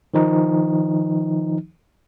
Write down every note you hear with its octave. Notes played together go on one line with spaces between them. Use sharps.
D#3 F3 D#4